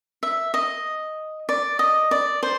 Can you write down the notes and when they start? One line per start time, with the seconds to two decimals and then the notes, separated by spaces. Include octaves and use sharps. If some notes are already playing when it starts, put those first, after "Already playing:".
0.23 E5
0.54 D#5
1.49 D5
1.79 D#5
2.11 D5
2.43 C5